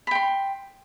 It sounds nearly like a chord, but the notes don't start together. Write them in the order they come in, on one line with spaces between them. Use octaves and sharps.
B5 G5 C6